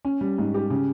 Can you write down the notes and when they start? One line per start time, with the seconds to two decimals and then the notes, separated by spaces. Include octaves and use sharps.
0.05 C#4
0.21 G3
0.38 G#2
0.54 G4
0.70 C#3